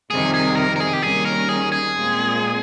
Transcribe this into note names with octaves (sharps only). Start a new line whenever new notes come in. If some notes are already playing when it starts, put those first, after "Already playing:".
F2 C3 D#3 G3 G#4
G#4
A#4
A#4
G#4
G4
D#2 D#3 G3 C#4 G#4
A#4
G#4
G#4
A#2 G#3 C4